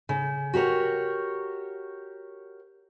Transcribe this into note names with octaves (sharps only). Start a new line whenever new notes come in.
C#3
F#4 G4 A#4 C#5